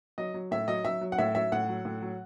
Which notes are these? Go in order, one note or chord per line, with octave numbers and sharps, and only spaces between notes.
F#3 D#5
F#3
A2 E5
F#3 D#5
F#3 E5
F#3
F#5
A2 E5
F#3 E5
A2 F#5
F#3
A2
F#3